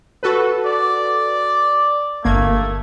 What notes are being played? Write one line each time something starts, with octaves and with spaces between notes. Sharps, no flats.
F#4 A4 B4
D5
G1 A3 A#3 G#6